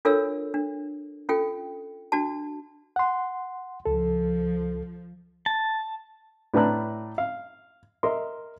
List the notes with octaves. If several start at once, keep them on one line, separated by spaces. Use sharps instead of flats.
D4 F4 A4 A#4 C#5 E6
D4
C#4 F4 A4 G5
D4 F#4 A5
F#5 C6
C#2 F3 A4
A5
A2 D4 B4 A5 A#5 F#6
F5
A#4 D#5 E5 C6